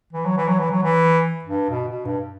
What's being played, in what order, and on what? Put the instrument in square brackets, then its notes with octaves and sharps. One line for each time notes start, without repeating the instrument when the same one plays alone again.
[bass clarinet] E3
F#3
E3
F#3
E3
F#3
E3
G2
B2
B2
G2